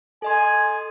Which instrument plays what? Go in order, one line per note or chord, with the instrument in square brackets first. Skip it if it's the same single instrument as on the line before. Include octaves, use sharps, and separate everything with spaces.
[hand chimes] A4 D#5 C6 [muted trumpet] G#5